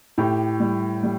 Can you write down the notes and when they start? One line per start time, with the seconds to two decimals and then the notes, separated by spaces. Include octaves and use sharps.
0.18 A2 G4
0.60 G3
1.03 G3